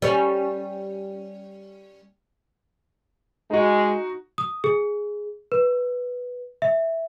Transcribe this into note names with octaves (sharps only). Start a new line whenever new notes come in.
G3 C#4
G#3 D#4 F#4
D#6
G#4
B4
E5